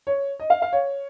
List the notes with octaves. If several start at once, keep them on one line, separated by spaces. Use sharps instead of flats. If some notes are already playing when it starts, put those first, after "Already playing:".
C#5
D#5
F5
F5
C#5